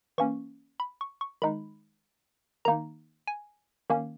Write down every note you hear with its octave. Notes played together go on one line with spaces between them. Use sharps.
E3 A#3 C#4 C#6
B5
C#6
C#6
D#3 G#3 D#4 B5
D#3 A#3 D#4 A#5
G#5
D#3 A#3 C#4